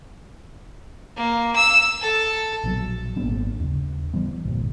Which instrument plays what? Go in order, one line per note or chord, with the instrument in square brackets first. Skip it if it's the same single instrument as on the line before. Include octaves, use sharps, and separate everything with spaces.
[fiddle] A#3
E6
A4
[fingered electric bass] A#1 B2 F#3
G#1 A#3 B3 D4
D#2 C#3
E3 G3 B3
D1 G1 C2 A#2